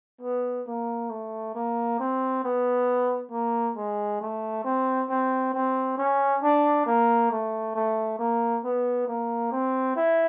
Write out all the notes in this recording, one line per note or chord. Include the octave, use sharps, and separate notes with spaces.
B3
A#3
A3
A#3
C4
B3
A#3
G#3
A3
C4
C4
C4
C#4
D4
A#3
A3
A3
A#3
B3
A#3
C4
E4